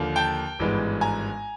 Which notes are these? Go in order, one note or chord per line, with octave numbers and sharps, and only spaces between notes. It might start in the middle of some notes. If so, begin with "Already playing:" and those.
Already playing: D#2 D3 F3 A#3
G5 A5
G#1 G2 E3 G#3 B3
G#5 A#5